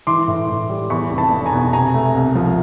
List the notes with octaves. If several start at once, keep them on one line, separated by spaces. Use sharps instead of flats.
E3 C6 D6
A2
A2
G3
E2 B5 C#6
F1
A5 B5
F1
G#5 A#5
B2
C3 G#5 A#5
A3
C2
F3